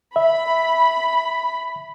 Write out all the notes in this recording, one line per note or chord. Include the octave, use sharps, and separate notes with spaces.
E5 B5